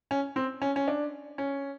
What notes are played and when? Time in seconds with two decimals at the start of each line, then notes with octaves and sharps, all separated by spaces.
0.11 C#4
0.36 C4
0.62 C#4
0.76 C#4
0.88 D4
1.38 C#4